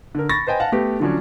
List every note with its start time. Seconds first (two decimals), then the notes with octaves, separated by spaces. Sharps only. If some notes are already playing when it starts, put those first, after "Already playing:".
0.15 D3 A#4
0.29 B5 C#6 A6 A#6
0.47 B4 C5 D#5 G5 G#5
0.60 F5 F#5 A5
0.72 A3 B3 G4
1.00 D3 F3 F#3 C#4 D4